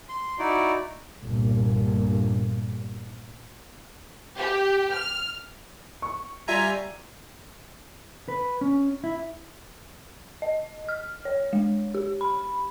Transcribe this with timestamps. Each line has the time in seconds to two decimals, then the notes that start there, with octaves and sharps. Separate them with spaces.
0.09 C6
0.39 D#4 E4 F#4 D5
1.22 G1 C2 G2 A#2
4.39 G4
4.94 F6
6.02 C#6
6.48 G3 F4 G4 E5 G#5 A#5
8.28 B4
8.61 C#4
9.04 E4
10.42 D#5
10.89 F6
11.25 C#5
11.53 G#3
11.94 G4
12.21 B5